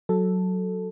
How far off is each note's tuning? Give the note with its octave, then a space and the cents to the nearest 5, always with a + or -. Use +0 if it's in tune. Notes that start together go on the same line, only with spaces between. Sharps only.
F#3 +0 A4 +0